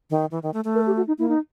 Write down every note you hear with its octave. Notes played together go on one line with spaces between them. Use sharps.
D#3
E3
D#3
A3
A3
A#4
G4
F#4
D#4
A#3 E4
D#4